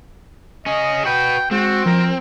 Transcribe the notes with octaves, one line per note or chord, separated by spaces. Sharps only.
C#4 G#4 D#5
F#4 B4 G5
G#3 C4 F#4
F3 A#4